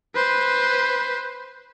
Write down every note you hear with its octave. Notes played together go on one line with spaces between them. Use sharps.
B4 C5